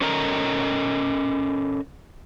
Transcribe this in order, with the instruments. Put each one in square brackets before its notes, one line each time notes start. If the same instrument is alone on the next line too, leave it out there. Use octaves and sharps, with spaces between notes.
[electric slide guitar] C#4 A4 A#4 D#5 A#5